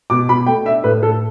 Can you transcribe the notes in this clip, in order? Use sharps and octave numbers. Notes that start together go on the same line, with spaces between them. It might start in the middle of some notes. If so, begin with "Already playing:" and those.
B2 D6
B2 B5
A3 G5
D4 E5
A2 B4
A2 A4